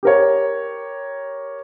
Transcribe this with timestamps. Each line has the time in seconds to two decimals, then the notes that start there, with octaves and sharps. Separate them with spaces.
0.03 G4 A#4 C#5